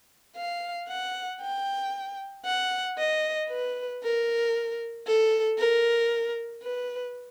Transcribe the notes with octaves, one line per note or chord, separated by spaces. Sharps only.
F5
F#5
G5
F#5
D#5
B4
A#4
A4
A#4
B4